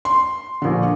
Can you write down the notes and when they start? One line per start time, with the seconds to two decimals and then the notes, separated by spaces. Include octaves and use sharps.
0.05 C6
0.62 A#1 D3